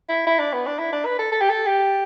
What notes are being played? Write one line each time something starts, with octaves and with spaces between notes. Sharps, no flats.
E4
E4
D4
B3
D4
E4
D4
B4
A4
A4
G4
A4
G4